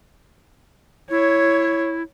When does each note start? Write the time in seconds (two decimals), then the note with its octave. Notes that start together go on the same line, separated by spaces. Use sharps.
1.10 E4 C#5